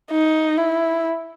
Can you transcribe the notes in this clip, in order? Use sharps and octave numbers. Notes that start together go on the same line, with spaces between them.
D#4
E4